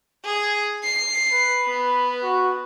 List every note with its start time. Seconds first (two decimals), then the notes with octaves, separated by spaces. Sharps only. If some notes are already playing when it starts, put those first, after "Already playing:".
0.24 G#4
0.84 C7
1.32 B4
1.66 B3
2.23 F#4